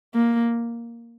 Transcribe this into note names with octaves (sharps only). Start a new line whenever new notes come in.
A#3